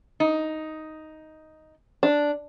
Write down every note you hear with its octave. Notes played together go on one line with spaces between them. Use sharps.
D#4
D4